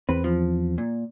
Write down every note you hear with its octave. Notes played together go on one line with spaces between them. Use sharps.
E2 C4 B4
F3
A#2